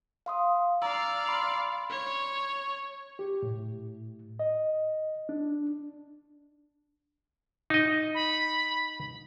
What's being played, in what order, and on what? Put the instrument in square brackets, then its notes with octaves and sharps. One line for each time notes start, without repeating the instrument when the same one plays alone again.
[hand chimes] F5 C6 D#6
[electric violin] D5 F5 [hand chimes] A#5 E6
[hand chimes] B5 C6
[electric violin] C#5
[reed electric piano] G4
A2
D#5
D4
[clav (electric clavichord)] D#4 D#5
[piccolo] B5